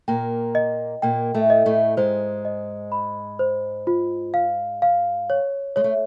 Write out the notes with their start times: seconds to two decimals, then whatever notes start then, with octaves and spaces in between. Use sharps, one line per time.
0.08 A#2 A#3 G5
0.55 D#5
1.02 A#2 A#3 G5
1.34 A2 A3
1.50 D#5
1.66 A2 A3
1.97 G#2 G#3 C5
2.45 D#5
2.92 B5
3.39 C5
3.87 F4
4.34 F5
4.82 F5
5.30 C#5
5.76 G#3 C#5
5.84 A3